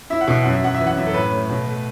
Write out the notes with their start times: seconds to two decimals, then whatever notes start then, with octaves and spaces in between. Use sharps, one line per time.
0.10 E4 E5
0.21 F#5
0.28 B2 E5
0.42 F#2 F#5
0.53 E5
0.63 F#2 F#5
0.74 E5
0.80 E3
0.86 F#5
0.97 F#2 E5
1.06 A4
1.14 A2 B4
1.31 A3
1.49 B2
1.67 A3